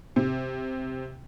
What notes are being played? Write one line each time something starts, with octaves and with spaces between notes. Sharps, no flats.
C3